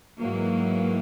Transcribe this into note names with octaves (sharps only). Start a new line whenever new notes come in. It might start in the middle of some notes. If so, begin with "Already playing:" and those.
G#2 E3 F#3 A#3